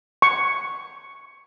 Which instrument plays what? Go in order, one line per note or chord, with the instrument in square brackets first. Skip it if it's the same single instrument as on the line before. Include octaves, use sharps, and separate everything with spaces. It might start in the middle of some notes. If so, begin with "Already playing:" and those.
[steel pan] C#6